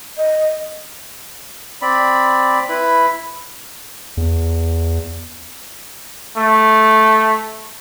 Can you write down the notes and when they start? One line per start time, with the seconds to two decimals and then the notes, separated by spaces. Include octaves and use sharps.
0.18 D#5
1.82 C4 D5 B5
2.69 E4 B4 B5
4.17 E2
6.38 A3